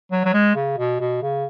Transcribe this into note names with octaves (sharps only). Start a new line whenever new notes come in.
F#3
F#3
G#3
C#3
B2
B2
C#3